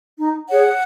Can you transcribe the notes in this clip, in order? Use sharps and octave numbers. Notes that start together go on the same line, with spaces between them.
D#4
G#4 C#5 F#5